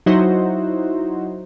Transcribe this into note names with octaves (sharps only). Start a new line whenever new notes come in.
F#3 D#4 E4 F#4 C5